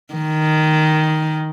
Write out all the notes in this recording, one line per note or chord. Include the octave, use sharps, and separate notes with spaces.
D#3